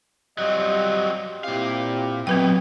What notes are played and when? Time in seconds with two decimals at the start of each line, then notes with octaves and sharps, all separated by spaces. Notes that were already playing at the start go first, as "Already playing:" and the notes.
0.38 F#3 G3 C4 F4 D#5
1.44 A#2 C4 E4 G4 F5
2.27 B2 F#3 G3 B3 C4 B4 G5